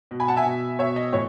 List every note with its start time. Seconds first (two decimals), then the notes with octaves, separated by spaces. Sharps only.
0.11 B2
0.20 G#5 B5
0.28 F#5 A5
0.36 E5 G#5
0.46 B2
0.79 B2 C#5 E5
0.96 D#5
1.12 A2 E3 C#5